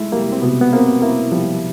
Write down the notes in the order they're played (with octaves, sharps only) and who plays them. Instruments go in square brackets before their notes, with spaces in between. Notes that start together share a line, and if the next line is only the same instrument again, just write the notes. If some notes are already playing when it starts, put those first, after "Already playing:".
Already playing: [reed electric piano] G#3 A3 [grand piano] E4
[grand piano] G3 [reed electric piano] A#3
[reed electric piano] C4
[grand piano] B2 [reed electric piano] B3
[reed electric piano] B3
[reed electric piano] A#3 [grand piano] C4
[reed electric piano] A#3 [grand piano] E4
[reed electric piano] F3 [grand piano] G3